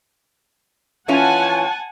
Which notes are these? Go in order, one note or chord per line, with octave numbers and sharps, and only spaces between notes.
E3 C#4 F4 F#5 G#5 A5